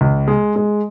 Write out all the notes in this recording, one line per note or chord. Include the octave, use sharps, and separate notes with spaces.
C#2
G#3
G#3